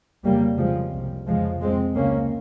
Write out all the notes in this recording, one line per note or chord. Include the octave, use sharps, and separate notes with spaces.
F2 C#3 G3 A#3
F2 C#3 F3 G#3
C2 C3
F2 C#3 F3 G#3
F2 C3 G#3 C4
C#2 C#3 A#3 C#4